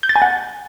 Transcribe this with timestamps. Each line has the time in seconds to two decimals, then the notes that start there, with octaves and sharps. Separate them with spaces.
0.03 G6
0.09 A6
0.16 G#5
0.22 F#5